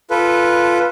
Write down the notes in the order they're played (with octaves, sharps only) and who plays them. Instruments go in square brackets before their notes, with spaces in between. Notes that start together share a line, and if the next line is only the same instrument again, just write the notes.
[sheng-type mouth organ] F4 A4 B4